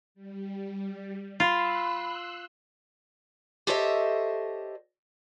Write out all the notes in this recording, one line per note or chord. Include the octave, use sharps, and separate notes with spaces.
G3
F4 B5 C6 E6 F#6
G4 A4 C5 C#5 D#5 E5